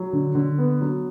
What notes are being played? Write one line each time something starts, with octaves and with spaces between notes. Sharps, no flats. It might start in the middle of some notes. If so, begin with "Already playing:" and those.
Already playing: F#3
D3
D3
B3
F#3